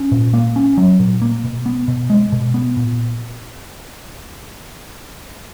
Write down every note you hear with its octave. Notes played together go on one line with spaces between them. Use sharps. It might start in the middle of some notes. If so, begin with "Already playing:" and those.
Already playing: C#4
A#2
A#3
C#4
F#3
A#2
A#3
B2
B3
B2
G#3
B2
B3
A#2